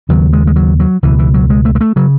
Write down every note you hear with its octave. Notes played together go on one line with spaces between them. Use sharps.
D#2 C#3 F#3
G#3
G#3
F#3
F#3
C#2 B2 E3
E3
F#3
G#3
A3
G#3
A3
C#3 F#3